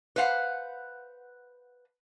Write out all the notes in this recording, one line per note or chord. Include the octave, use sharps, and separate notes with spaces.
B4 C5 F5 F#5